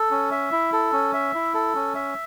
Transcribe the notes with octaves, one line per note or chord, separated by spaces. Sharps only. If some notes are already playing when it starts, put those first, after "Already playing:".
Already playing: A4
C#4
E5
E4
A4
C#4
E5
E4
A4
C#4
E5